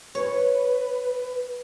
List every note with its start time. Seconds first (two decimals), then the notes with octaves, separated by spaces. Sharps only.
0.15 B4 C#5